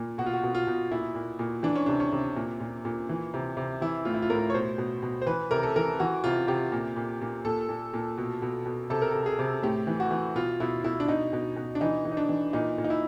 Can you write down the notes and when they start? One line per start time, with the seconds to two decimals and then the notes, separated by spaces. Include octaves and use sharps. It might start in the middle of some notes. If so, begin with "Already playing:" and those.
Already playing: A#2
0.18 B2 F#4
0.26 F4
0.34 F#4
0.43 B2
0.55 F4
0.67 B2
0.91 A#2 E4
1.15 A#2
1.39 A#2
1.63 E3 D4
1.75 C#4
1.86 C3 D4
2.00 C#4
2.13 C3
2.36 A#2
2.60 A#2
2.85 A#2
3.09 E3
3.34 C3
3.57 C3
3.81 E3 E4
4.05 A2 F4
4.14 E4
4.22 F4
4.29 A2 A#4
4.50 C#5
4.54 B2 C5
4.78 B2
5.03 B2
5.22 C5
5.26 E3 B4
5.51 C3 A#4
5.63 A4
5.76 E3 A#4
6.00 E3 F#4
6.24 C3 F4
6.47 C3 G4
6.72 A#2
6.96 A#2
7.21 A#2
7.45 A#2 A4
7.69 A#2
7.94 A#2
8.17 B2
8.42 B2
8.66 B2
8.90 C3 A4
9.02 A#4
9.12 C3 A4
9.26 G#4
9.39 C3
9.63 A2 G4
9.87 E3
10.00 F#4
10.11 E3
10.35 B2 F4
10.60 B2 E4
10.84 B2 E4
11.00 D4
11.08 B2 D#4
11.33 B2
11.56 B2
11.75 D4
11.81 E3 D#4
12.05 E3
12.12 D#4
12.17 D4
12.29 E3
12.53 A#2 D#4
12.78 A#2
12.84 D#4
12.90 E4